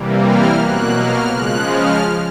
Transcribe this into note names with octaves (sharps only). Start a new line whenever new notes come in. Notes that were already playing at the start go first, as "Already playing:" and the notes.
Already playing: C3 E3 G3 A#3
F6
B2 F#3 A#3 F#6
F6
C#3 F3 G#3 F#6
F6